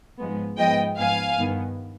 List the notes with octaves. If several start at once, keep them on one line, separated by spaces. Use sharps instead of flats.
G#2 F3 G#3 B3
G#2 F3 G#3 B3 D#5 G5
G#2 F3 B3 F5 G#5
G2 D#3 B3